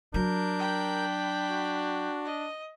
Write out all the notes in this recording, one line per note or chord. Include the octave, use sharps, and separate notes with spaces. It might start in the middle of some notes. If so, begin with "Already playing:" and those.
F#3 D4 A#4 G6
G5 B5
F#4
D#5